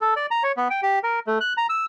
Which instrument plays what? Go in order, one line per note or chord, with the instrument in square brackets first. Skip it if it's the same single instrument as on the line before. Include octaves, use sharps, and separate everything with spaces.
[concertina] A4
D5
A#5
C#5
B3
G5
G4
A#4
A3
F#6
A#5
E6